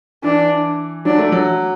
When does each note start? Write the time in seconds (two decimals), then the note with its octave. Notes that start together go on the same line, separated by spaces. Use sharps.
0.24 E3 D4
1.05 F#3 D4
1.18 A3
1.32 F#3